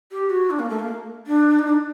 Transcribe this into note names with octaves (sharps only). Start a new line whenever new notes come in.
G4
F#4
D4
A#3
A3
A#3
D4
D#4
D4